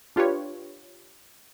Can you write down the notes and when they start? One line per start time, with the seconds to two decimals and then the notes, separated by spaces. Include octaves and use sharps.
0.16 D4 F4 G4 B4 C#5